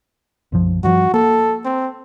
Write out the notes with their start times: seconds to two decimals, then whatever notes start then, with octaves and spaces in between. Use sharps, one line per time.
0.52 B1 F#2 F3
0.84 G2 F3 F#4
1.14 A#3 A4
1.65 C4